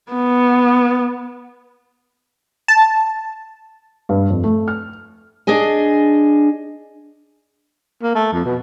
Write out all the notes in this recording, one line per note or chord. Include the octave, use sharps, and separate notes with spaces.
B3
A5
G2
F2
A3
F6
D4 G#4 D#5 G#5
A#3
A3
F2
B2